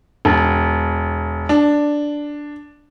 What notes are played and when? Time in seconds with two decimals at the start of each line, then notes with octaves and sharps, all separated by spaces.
0.25 E1
1.49 D4